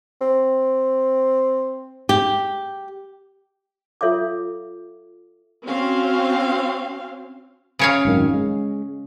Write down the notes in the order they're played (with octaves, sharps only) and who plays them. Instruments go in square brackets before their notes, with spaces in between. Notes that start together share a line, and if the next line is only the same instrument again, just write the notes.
[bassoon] C4
[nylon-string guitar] G4
[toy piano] F4 A4 C#5 E5 F5 D6
[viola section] C4 C#4 F#4 F5
[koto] C#3 C#5 F5
[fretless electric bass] G#1 F#2 D#3
G#3